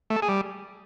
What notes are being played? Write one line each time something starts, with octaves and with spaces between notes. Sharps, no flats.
A3
A4
G#4
G3